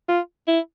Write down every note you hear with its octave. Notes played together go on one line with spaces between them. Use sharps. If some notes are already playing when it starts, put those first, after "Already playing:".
F4
E4